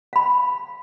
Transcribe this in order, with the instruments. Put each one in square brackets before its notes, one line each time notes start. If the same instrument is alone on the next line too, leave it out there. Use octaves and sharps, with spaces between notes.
[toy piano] F5 B5